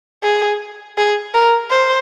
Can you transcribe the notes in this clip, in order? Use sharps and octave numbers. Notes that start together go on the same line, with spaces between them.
G#4
G#4
A#4
C5